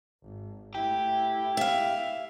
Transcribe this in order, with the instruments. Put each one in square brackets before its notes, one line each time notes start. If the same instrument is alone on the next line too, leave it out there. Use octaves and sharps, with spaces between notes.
[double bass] G#1
[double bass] A3 E4 [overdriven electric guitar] G4
[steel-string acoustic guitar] E5 F5